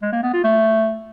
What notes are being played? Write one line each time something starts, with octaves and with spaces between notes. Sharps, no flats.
G#3
A#3
B3
F4
A3